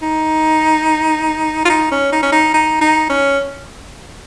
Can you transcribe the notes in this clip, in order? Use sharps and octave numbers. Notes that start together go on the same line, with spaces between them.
D#4
F4
D#4
C#4
D#4
C#4
D#4
D#4
D#4
C#4